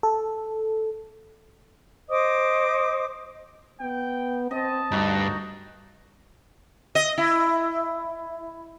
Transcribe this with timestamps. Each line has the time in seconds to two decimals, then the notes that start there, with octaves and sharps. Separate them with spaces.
0.03 A4
2.09 C5 D#5 D6 D#6
3.81 B3 G5
4.51 C4 D#5 A5
4.91 D2 G2 D#4 F#4
6.95 D#5
7.18 E4